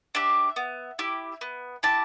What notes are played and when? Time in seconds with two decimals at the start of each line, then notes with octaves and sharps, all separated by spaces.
0.15 D4 G4 E5
0.56 B3
0.99 E4 G4
1.41 B3
1.83 E4 G4 A5